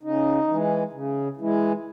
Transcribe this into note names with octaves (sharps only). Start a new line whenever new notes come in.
C#3 D#4
E3 G#3
C#3
E3 G#3